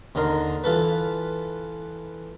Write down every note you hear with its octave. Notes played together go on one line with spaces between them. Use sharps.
D#2 D3 D#4 A#4 C6
E3 F4 A4 B4